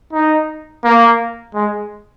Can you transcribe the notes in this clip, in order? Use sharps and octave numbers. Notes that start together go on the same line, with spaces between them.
D#4
A#3
G#3